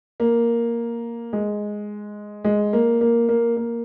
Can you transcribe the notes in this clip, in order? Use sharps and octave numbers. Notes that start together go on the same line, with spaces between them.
A#3
G#3
G#3
A#3
A#3
A#3
A#3